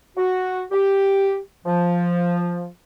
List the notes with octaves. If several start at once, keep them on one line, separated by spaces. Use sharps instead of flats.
F#4
G4
F3